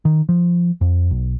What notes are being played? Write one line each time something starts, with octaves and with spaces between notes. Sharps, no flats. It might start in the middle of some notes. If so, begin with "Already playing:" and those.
D#3
F3
F2
B1